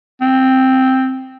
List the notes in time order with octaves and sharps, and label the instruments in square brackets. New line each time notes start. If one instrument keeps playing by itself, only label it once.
[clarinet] C4